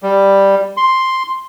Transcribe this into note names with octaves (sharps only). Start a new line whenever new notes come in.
G3
C6